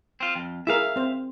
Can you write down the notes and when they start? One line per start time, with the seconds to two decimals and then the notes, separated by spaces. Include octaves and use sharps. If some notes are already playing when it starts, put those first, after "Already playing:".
0.20 C4 F4
0.35 F2
0.67 E4 G#4 A#4 E5 F5
0.96 C4 C5